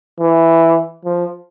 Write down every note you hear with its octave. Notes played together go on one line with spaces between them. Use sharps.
E3
F3